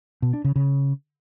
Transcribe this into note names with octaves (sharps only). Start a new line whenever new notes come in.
B2
D4
C#3
C#3